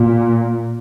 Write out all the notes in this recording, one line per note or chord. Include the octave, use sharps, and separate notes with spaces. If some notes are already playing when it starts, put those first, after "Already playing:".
Already playing: A#2